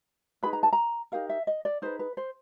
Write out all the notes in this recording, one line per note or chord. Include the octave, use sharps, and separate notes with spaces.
D#4 G#4 B4 B5
A#5
A5
A#5
D#4 G4 A#4 F5
E5
D#5
D5
D#4 G#4 B4 C5
B4
C5